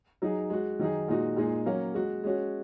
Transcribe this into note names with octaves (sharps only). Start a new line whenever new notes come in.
F#3 D#4 G#4
G#3 F#4
D#3 F#3 D#4 G#4
A#2 G#3 D#4 F#4
A#2 G#3 D#4 G#4
F#3 A#3 C#4
G#3 F#4
G#3 C#4 F#4